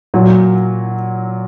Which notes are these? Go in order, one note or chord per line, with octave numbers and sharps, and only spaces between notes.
A#2 F#3